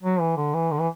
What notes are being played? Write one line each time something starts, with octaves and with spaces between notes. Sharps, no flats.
F#3
E3
D3
E3
D3
E3